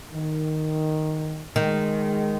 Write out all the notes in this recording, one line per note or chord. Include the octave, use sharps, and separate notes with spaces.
D#3
D#3 G#3